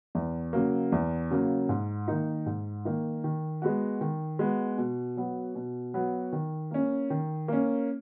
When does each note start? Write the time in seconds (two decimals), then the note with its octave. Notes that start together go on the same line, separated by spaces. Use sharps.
0.15 E2
0.53 C#3 F#3 A#3
0.92 E2
1.31 C#3 F#3 A#3
1.69 G#2
2.08 D#3 A#3 D#4
2.46 G#2
2.85 D#3 A#3 D#4
3.24 D#3
3.62 G#3 B3 F#4
4.01 D#3
4.39 G#3 B3 F#4
4.78 B2
5.17 F#3 B3 F#4
5.55 B2
5.94 F#3 B3 F#4
6.32 D#3
6.71 A#3 C#4
7.10 D#3
7.48 A#3 C#4